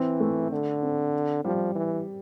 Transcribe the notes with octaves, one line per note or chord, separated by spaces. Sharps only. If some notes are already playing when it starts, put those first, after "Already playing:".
Already playing: E3 C4
A3
D3
C4
F3 G3
E3